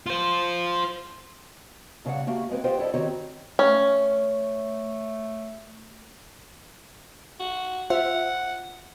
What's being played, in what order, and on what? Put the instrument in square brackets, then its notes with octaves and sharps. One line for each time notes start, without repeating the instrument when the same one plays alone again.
[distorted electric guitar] F4 C5
[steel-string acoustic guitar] A#2 C#3 G3 D5 F5 F#5
A3 A#3 F#4 G4
E2 G#3 C4 B4
F4 G4 C5 D#5 F#5 G5
E4 A4 D5 D#5
D#3 C4 F#4 G4 C#5 A#5
[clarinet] A3 [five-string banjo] C#4
[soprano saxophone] F#4
[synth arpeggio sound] F4 C5 E5 [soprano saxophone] F#5